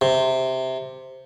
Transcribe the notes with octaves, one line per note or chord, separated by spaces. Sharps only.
C3